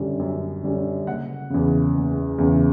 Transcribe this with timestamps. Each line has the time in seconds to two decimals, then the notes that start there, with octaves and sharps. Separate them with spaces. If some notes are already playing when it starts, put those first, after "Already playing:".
Already playing: F#2 D3 G3 C#4
0.19 F#2
0.63 D3 G3 C#4
1.07 F#1 F#5
1.50 E2 C#3
1.95 F#1
2.38 E2 C#3